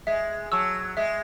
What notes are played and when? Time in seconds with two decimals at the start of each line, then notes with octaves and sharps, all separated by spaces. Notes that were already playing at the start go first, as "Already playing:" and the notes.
0.07 G#3 E5
0.52 F#3 A5 C#6 E6
0.97 G#3 E5